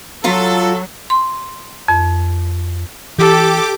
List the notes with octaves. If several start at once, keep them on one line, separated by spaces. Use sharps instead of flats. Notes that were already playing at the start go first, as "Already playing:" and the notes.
F#3 F4 A4 F5 A#5
C6
F2
E3 G4 A4 D6